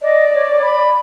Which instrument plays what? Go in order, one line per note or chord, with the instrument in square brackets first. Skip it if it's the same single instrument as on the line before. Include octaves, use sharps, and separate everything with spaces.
[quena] D5 [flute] D#5
[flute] C#5
B5